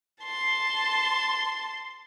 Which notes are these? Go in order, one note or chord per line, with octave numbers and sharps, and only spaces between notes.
A5 C6